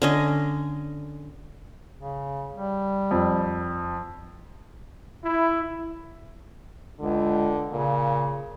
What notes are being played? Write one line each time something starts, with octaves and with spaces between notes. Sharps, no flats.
D3 C#4 D#5
C#3
G3
F2
E4
C#2 D3
A#2 C#3